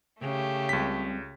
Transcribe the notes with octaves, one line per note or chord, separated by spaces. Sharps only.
C#3 A3 G4
C#2 G3 C4 B6